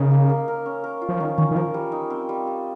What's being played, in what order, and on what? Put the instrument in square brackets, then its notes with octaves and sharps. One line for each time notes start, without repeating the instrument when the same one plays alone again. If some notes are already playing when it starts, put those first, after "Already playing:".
Already playing: [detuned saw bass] C#3 [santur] D#4 A#4
[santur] A#3
A#3
A#4
C#4
A#4
F4
[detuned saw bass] F3
[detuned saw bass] D#3 [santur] C#4
[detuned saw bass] D#3 [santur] C#4
[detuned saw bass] D#3
[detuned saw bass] F3 [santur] A#4
[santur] G3
D#4
C4
G3
G3